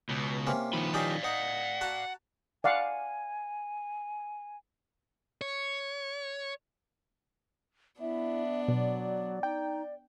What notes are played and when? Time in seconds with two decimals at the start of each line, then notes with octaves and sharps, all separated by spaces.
0.09 C#2 B2
0.47 C3 A#3 C#4
0.73 D#3 F3 F#5 B5
0.94 C#4 D#4 G4 D5 F5
1.24 D#4 F#5
1.81 F#4 A5 A#5
2.64 D5 F5 F#5 G#5
5.41 C#5
8.00 B3 D4 E4 E5
8.68 B2 F#3 D5
9.43 D#4 G5